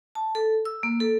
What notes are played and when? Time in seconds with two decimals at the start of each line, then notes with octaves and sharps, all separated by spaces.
0.15 A5
0.35 A4
0.65 E6
0.83 A#3
1.00 A4